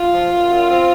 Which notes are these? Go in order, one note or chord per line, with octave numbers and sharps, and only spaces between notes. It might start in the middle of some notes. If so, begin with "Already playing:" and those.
Already playing: F4
F3
F#2
F#2
C4